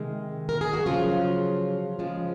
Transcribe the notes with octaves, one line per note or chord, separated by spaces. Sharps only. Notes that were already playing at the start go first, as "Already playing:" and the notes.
Already playing: C3 D#3 G#3
A#4
G#4
F#4
C#3 F3 F#3 F4
C#3 F3 G#3